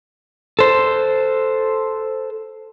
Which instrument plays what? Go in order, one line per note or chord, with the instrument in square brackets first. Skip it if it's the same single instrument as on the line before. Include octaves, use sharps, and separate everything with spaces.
[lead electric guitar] A4 C5